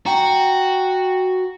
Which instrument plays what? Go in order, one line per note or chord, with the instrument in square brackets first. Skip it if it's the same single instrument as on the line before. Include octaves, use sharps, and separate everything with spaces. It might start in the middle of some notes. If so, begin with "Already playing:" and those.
[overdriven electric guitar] F#4 [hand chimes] G5 A#5